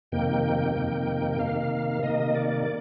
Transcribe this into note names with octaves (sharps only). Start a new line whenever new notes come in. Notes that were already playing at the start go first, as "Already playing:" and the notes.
F2 C3 D#3 A#3 G5
F2 C3 D#3 A#3
G5
C3 D#3 A#3 F5
C3 D#3 A#3 D#5
D5